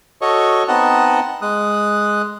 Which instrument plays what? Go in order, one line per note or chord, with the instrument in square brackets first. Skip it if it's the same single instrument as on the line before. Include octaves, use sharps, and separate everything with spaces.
[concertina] F#4 A4 C#5 D#5 C#6
B3 C4 D#4 D#5 F#5 A5
G#3 D#6 F#6